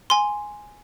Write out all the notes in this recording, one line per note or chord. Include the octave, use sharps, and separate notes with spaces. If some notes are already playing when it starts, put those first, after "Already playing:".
G#5 C6